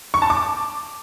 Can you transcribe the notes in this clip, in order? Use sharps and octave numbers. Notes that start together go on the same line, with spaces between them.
C#6
A5
D6